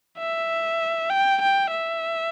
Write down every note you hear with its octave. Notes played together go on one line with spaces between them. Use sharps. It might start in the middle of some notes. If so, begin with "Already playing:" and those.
E5
G5
G5
E5